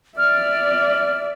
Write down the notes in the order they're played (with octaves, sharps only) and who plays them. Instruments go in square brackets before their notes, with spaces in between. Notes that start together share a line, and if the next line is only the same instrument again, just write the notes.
[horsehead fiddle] D5 E5 [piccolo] F6